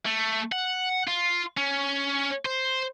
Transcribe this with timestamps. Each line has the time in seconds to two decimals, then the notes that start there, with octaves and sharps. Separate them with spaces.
0.06 A3
0.52 F#5
1.08 F4
1.57 C#4
2.45 C5